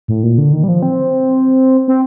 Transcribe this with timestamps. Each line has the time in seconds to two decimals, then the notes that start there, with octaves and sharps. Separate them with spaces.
0.08 A2
0.23 A#2
0.38 D3
0.53 D#3
0.64 G3
0.68 F3
0.83 C4
1.88 C4